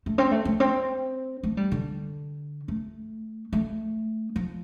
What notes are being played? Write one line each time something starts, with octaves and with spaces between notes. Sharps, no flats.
A3
C4
A3
A3
C4
A3
G3
D3
A3
A3
F3